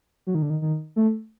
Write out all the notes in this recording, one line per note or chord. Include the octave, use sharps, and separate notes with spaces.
F#3
D#3
D3
D#3
D#3
A3